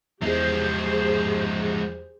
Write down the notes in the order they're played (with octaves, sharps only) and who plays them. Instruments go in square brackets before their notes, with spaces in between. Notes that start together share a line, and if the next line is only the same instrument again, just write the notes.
[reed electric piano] E2 [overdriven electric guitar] F3 G#3 [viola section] G4 G#4 C5